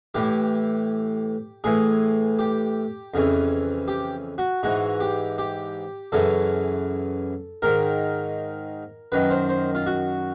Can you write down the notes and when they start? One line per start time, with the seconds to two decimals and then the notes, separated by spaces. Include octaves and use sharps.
0.15 A2 E3 G4
1.64 A2 E3 G#4
2.39 G4
3.14 F2 C#3 E3
3.88 G4
4.38 F#4
4.63 G#2 E3 F#4
5.00 G4
5.38 G4
6.12 F#2 C#3 E3 A4
7.62 G#2 D#3 A#4
9.12 F#2 D#3 B4
9.30 C5
9.49 C5
9.75 F4
9.87 F#4